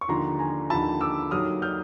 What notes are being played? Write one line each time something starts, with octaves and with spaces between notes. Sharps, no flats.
C#6
D#2 D3 F3 A#5 C6
G#5 A#5
D#2 D3 F3 A5 B5
D6 E6
D#2 D#3 F#3 D#6 F6
F6 G6